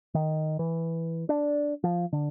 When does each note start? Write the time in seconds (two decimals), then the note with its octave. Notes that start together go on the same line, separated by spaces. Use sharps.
0.14 D#3
0.59 E3
1.29 D4
1.84 F3
2.13 D3